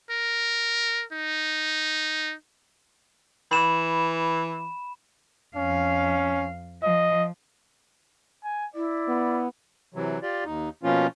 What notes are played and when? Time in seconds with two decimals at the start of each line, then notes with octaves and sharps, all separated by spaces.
0.10 A#4
1.12 D#4
3.51 E3 B5 E7
5.56 F2 C#4 F5
6.83 F3 D#5
8.44 G#5
8.75 E4 D5
9.08 B3
9.94 C3 E3 F#3
10.22 F4 G4 D5
10.45 D#2 D#4
10.83 B2 F3 A#3 C#4 F4